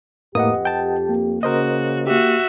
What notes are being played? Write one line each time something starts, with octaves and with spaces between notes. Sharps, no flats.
F2 A2 A#3 G4 B4 D#5 F#5 D#6
G5 A5
A#3
C#3 F#4 A#4 C5 D#5
A#3 F#4 G4 E5